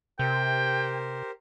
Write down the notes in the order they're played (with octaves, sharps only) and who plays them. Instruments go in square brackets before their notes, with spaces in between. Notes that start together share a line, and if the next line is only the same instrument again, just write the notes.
[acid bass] C3 [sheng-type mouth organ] G4 A#4 C5 [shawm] G5